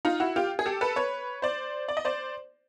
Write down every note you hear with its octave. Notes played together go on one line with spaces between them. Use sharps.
D#4 F4
E4 F#4
F4 G4
G#4
G4 A4
A4 B4
B4 C#5
C5 D5
D5
D#5
C5 D5